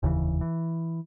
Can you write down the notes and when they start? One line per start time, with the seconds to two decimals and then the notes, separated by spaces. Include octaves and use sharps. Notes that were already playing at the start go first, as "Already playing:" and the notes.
0.03 F1 D#2 C#3 E3
0.41 E3